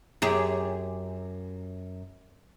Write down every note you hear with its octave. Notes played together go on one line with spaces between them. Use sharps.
F#2 G4 G#4